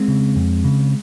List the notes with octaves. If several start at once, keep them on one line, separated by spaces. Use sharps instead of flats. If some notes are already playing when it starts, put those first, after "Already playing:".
Already playing: G#3 C4
C#3
F2
C#3